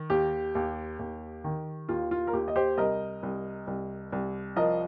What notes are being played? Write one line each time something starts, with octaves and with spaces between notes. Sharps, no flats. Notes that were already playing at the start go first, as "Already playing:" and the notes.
Already playing: D#3
D#2 G4
D#2
D#2
D#3
D#2 F4
F4
A#4
D#2 G4
D#5
G4 C5
C2 A#4 D#5
C2
C2
C2
F3 A#4 D#5